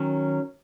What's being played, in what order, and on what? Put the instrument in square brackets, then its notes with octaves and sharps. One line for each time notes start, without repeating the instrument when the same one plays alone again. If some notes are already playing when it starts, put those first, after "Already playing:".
Already playing: [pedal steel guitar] D#3 F#3 C#4